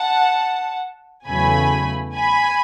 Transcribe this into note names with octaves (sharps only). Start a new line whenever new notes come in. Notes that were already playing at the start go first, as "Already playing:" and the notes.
Already playing: F#5 A5
E2 C#3 F#3 A3 G#5 B5
G#5 B5